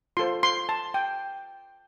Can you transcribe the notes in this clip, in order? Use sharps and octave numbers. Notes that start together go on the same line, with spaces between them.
F4 A4 C5 C6
C6
A5
G5